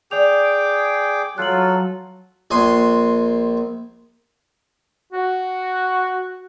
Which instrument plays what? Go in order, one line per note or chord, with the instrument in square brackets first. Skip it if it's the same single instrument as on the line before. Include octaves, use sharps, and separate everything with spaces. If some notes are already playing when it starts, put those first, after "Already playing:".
[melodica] G#4 G5 D6 [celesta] D5 F7
[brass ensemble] F#3 [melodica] F4 A4 [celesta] F#6 F#7
[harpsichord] A#1 G#5 C6
[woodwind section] F#4